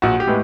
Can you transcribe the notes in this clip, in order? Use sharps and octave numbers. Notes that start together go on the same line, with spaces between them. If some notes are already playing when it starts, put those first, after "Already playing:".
A#1 F#4
G4
A2 G#3 B3